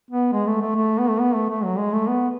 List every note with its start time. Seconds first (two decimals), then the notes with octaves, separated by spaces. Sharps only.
0.11 B3
0.32 G#3
0.47 A3
0.62 A3
0.76 A3
0.98 B3
1.09 A3
1.20 B3
1.34 A3
1.49 A3
1.64 F#3
1.78 G#3
1.93 A3
2.08 B3